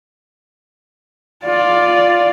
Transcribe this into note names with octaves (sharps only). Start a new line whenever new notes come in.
F4 D5